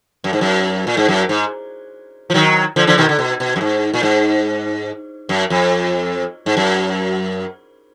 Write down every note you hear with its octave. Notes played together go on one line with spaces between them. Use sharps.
F#2
G#2
F#2
A#2
G#2
F#2
G#2
F3
D#3 F#3
D3 F3
D3 F3
B2 D#3
D3
B2
B2
F#2
G#2
A#2
G#2
F#2
F2
G#2
F#2